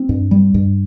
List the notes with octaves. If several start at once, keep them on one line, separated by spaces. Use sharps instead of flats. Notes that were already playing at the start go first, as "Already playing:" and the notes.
Already playing: C4
G2
G3
G2